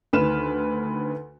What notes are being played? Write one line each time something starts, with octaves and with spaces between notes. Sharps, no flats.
D2 D#3 B4 F6 E7